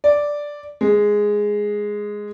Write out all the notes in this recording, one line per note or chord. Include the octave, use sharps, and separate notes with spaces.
D5
G#3